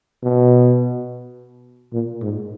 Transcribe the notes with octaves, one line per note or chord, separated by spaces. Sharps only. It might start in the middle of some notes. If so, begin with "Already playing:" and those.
B2
A#2
G#2